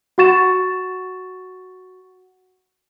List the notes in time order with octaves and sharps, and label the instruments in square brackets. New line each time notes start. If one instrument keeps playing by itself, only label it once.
[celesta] F#4 F#5 C#6 A6 E7